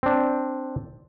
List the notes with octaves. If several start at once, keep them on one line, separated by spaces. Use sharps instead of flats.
C4 D4